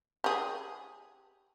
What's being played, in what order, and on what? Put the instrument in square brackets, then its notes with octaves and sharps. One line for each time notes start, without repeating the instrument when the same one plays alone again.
[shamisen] G4 G#4